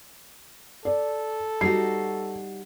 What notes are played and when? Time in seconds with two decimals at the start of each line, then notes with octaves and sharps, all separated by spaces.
0.85 A4 D5
1.61 G3 D#4 F#4 C7